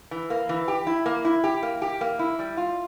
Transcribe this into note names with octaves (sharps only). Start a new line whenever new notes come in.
E3
A#3
E3
G4
E4
A#3
E4
G4
A#3
G4
A#3
E4
G3
F4